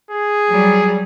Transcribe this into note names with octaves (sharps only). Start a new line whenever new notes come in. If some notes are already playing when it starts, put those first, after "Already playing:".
G#4
F#3 G3